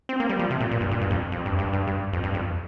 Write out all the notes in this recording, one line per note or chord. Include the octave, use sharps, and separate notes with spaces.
C4
A#3
G3
F3
C3
A#2
A#2
G2
A#2
G2
F2
F2
G2
G2
G2
G2
F2
G2
F2